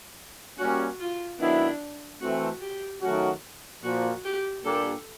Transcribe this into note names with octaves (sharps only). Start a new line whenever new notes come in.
G3 A#3 C#4 F#4
F4
D#3 F#3 B3 D4 E4
E3 A3 C4 F#4
G4
D#3 F#3 A3 C#4 F#4
A#2 F3 A#3 F#4
G4
A#2 G3 A#3 D4 G4 A4